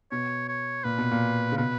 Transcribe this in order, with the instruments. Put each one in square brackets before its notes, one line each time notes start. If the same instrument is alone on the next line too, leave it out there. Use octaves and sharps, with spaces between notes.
[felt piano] B2 [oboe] C#5
[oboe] C#5
[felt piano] A#2 [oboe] B4
[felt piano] B2
A#2
C#3
[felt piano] B2 [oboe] B4